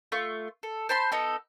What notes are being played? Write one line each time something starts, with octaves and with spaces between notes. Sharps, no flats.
A3 F4 C#6
A4
C5 A5 B5 C6
B3 D#4 A4